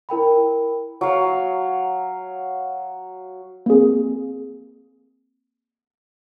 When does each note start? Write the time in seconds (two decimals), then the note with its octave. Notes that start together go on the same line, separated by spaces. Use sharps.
0.09 E4 A#4 G5 B5
1.01 F#3 F5 D#6
3.66 A#3 C4 G#4